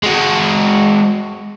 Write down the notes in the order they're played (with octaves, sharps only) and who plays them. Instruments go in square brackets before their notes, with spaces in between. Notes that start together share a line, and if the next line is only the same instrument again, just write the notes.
[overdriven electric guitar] G#3 F#4